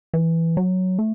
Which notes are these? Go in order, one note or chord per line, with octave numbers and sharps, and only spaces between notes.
E3
F#3
A3